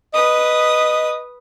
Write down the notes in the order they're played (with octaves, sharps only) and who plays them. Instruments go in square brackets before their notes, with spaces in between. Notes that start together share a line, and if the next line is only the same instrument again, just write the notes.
[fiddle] B4 D#6 [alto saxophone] D#5